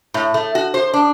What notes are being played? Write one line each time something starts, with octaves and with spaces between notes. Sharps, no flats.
A2
A3
F#4
C5
D4